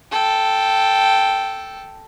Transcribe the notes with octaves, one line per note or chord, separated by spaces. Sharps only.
A4 G5